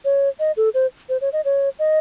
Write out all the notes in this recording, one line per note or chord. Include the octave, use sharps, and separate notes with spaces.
C#5
D#5
A4
C5
C5
C#5
D#5
C#5
D#5